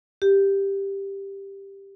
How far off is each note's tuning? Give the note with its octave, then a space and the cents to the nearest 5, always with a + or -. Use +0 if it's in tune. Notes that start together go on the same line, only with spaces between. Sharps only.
G4 +5